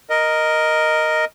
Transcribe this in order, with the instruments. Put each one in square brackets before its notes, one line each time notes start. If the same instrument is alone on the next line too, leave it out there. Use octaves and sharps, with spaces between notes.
[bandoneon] A#4 D#5